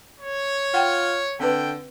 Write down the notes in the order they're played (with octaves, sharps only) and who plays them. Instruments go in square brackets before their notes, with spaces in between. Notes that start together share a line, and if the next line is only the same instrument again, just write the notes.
[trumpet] C#5
[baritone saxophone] F4 [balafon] F#5 G5
[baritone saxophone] D3 [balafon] C4 B4 [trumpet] G5